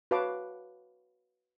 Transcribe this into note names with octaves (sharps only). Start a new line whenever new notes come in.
F#4 B4 C#5 F5 A5 D6